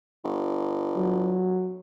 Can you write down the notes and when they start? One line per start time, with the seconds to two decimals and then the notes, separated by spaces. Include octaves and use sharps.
0.24 G1
0.96 F#3